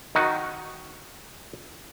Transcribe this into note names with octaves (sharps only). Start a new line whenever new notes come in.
D#3 D#4 F#4